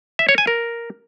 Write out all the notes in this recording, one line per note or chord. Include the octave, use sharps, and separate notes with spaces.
E5
C#5
G#5
A#4